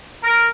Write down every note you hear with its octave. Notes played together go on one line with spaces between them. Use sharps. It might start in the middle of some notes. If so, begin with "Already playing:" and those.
A#4